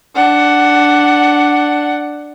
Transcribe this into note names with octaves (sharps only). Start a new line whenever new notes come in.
D4 F#5